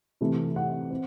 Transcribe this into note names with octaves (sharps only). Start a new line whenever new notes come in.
C3 E3 A3
F#5
C4